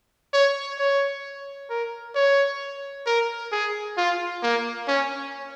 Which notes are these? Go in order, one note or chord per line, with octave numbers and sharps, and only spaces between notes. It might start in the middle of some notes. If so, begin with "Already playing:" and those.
C#5
C#5
A#4
C#5
A#4
G#4
F4
A#3
C#4